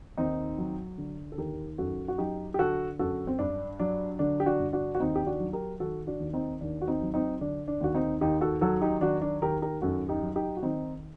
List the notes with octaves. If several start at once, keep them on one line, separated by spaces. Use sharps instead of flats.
D#2 C4 D#4
F#3
D3
A4
D#2 G4 A#4
F#2 F#4 A4
F#4
F#3 D#4 G4
G4
D3 F#4 A4
F#2 F#4 A4
C4
G2 D4
F#3 D4
D3 D4
G4
D4 F#4
G2
D4 F#4
F#4
D#2 C4 D#4
G4
D4 F#4
F#3
G4 A#4
D#3 F#4 A4
D4 F#4
D#2
C4 D#4
D#2 D4
F#4
C4 D#4
F#3
C4 D#4
D3 D4
D4
D#2 F#4
C4 D#4
D#2 D#4 G4
F#4 A4
F#3 F#4 A4
D#4 G4
D#3 D4 F#4
D4
D#2 G4 A#4
G4 A#4
F#2 F#4 A4
D#4 G4
F#3
D#4 G4
F#4
D#3 C4 D#4